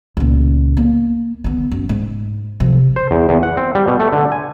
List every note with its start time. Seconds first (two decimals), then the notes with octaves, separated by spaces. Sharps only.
0.17 C#2 A#2
0.77 A#3
1.44 D3 B3
1.71 F#2
1.89 G#2
2.60 C3 F3
2.96 C5
3.11 E2
3.29 E2
3.43 F#5
3.57 C4
3.75 G3
3.88 B2
4.00 A3
4.13 D3
4.32 G#5